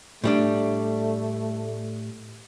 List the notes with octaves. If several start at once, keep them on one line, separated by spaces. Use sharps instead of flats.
A2 G3 A3 D4